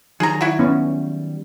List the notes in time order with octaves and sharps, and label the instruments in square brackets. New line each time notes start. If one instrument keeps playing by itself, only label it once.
[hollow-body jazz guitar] D#3 F#3 G3 [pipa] G#4 A#5
[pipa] E4 F#4
[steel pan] B3 C#4